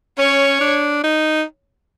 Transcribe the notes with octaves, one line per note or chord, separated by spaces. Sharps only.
C#4 C#5
D4
D#4